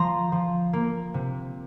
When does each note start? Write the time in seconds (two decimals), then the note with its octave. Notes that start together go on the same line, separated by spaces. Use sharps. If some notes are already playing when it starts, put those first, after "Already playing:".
Already playing: F3 A#5 C6
0.32 F3
0.73 A#3
1.14 C3